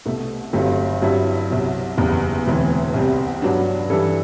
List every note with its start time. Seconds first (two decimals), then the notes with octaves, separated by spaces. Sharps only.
0.05 C2 B2 A3
0.53 G1 G2 F#3 A3 C4
1.02 G2 F#3 C4 E4 G4
1.50 C2 B2 F#3
1.97 F#1 E2 B2 G3 B3
2.47 E1 D2 C3 E3
2.94 C2 B2 G3 C4
3.42 G2 F#3 B3 D4
3.90 G2 E3 G3 D4 A4